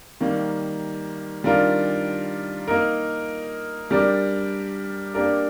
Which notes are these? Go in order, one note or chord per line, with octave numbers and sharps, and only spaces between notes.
D#3 G3 A#3
D#3 G3 D4 F4 A#4
A#3 D#4 A#4
G3 D4 G4 A#4 D5
A#3 D4 G4 A#4 D5